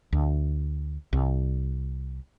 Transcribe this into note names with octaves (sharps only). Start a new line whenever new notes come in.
D2
C2